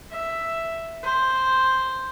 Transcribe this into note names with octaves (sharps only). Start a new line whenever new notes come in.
E5
C5